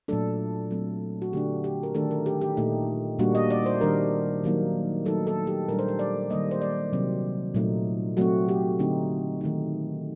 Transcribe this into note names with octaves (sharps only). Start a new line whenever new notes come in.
A#2 F#3 A3 D4 A4
F#3 A3 C4
F#4
D3 A3 D4 G4
G4
A#4
D#3 A3 D4 A4
A#4
G4
G4
A#2 A3 D#4
A#2 G3 A#3 D4 F#4
D#5
D5
C5
D#3 G3 D4 A#4
D#3 F#3 A#3 D#4
F#3 A3 D#4 A4
A4
G4
A#2 G3 D4 A#4
C5
A#4
D5
D#3 G3 A#3 D#5
C5
D5
C3 F#3 C4
A#2 F#3 A3 D#4
F#3 A3 C4 F#4
G4
D3 A3 C4 D#4
D#3 A3 D#4